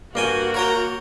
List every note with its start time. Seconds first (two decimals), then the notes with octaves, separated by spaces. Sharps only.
0.15 G2 A#3 F#4 G5 G#5
0.54 A#4 C#5 G5 A#5